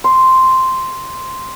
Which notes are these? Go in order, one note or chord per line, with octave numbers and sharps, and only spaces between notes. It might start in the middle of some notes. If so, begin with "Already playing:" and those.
C6